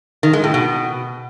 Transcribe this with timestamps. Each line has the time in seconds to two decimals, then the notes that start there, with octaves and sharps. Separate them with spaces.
0.23 D#3
0.33 G#3
0.44 A2
0.54 B2